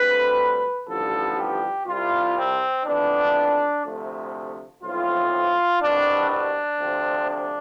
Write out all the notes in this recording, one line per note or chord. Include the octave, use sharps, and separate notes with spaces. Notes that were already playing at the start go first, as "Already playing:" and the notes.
Already playing: D2 D3 G3 C4 B4
A1 G2 D3 F3 B3 A4
G4
C2 C3 G3 F4
C4
F2 E3 B3 D4
D2 C3 F3 A3
B1 A2 F3 C4 F4
C2 B2 G3 C4 D4
D4
D2 C3 F3 C4
D4